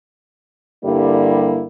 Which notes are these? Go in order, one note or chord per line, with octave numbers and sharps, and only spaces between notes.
G2 D3 G3 A#3 E4